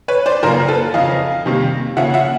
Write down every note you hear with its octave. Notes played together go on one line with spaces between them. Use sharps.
B4 C#5
C5 D5
F#2 C#3 F3 A#3 A#4 C5
A4 B4
F2 C#3 F3 D#5 F5
F2 C3 D#3 G3 A#3
C#3 F3 A#3 C#4 E5 F#5
E5 F#5